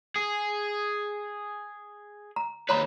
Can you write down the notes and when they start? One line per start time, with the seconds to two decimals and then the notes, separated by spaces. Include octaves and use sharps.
0.16 G#4
2.36 A#5
2.69 D#2 B4 C#5 A#5 B5